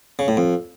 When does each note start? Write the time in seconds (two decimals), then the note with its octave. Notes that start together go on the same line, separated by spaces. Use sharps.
0.19 C#3
0.28 A2
0.37 F2